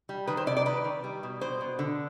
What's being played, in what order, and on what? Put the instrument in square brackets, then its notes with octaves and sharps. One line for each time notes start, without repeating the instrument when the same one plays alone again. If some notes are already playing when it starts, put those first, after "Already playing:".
[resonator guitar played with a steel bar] G3
D#3 B4
C5
C3 D5
D5
D#3 B4
D#3
G3
B2
B2 C5
B2
D3